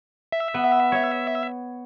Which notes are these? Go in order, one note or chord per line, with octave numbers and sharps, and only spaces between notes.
E5
B3
C#5